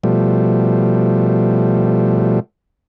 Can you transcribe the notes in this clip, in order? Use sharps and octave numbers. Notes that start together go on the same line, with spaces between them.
B2 F3 G3 A3